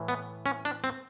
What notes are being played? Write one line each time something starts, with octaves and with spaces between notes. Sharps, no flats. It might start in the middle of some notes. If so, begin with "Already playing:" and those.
Already playing: A2 E3
B3
C#4
D4
C4